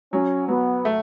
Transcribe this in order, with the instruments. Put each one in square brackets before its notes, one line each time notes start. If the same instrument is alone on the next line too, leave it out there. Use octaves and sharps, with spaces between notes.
[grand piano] F#3 [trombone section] C#4
[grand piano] F#3 [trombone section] B3
[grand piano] A3